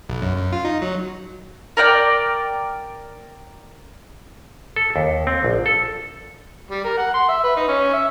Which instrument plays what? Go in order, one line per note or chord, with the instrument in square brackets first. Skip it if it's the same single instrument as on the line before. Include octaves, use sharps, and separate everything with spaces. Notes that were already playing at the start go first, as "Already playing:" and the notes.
[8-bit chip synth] B1
F#2
F#2
F4
D#4
F#3
[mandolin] A#4 D5 F#5 G5
[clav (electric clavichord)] A4
D#2
C4
A#1
A4
[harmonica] G3
A#4
F#5
C6
E5
B4
D#4
C#4
E5